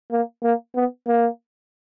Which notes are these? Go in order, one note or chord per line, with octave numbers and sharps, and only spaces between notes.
A#3
A#3
B3
A#3